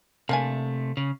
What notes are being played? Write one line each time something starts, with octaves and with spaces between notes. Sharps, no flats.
C3 A3 A#3 D4 G#5
C#3